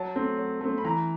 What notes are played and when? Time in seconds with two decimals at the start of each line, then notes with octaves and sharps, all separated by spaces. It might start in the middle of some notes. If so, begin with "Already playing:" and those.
Already playing: F#3 A5
0.15 A3 C4
0.38 F#3
0.61 A3 C4
0.78 B5
0.84 E3 A#5